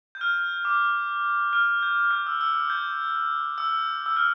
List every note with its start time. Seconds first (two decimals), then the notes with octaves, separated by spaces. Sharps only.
0.15 G6
0.21 F6
0.65 D6
1.53 F6
1.83 G6
2.11 F6
2.26 E6
2.41 E6
2.70 G6
3.58 E6
4.06 E6
4.16 F6